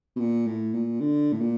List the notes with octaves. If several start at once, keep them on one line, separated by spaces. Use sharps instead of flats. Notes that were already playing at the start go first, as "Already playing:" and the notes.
B2
A#2
A2
A#2
D3
A2
A#2